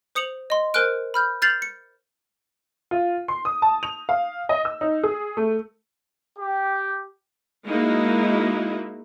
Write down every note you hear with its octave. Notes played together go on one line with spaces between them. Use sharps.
C5 D#6 C#7 F7 F#7
D#5 C6
A#4 C5 G#5 F6 F#6 D7
B5 F6 G6
F6 G6 A6 C7 F7 F#7
C#7
F4
C6
D#6
A5
F7
F5
D#5
E6
D#4
G#4
A3
G4
G#3 A#3 D#4 E4 F#4